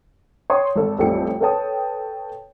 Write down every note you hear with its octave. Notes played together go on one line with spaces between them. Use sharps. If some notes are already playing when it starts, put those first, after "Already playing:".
C#5 G5 C6 D#6
G#1 A4
A1 F2 G3 A4 G5 C#7
A4 B4 C#5 G5 A5 D#6